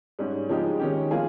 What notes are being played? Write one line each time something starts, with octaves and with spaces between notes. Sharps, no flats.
G#2 G3 C#4
C#3 F3 G#3 D#4 G4
D#3 G#3 C#4 G4
F3 A#3 F4 G#4